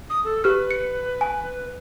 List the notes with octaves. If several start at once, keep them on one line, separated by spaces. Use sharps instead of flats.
D#6
A4
G4 B4 F6
C#7
G#5